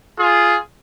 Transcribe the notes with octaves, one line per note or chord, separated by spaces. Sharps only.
F4 G#4